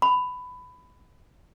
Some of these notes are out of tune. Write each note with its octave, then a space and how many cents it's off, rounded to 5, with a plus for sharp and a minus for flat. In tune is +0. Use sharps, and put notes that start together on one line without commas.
B5 +15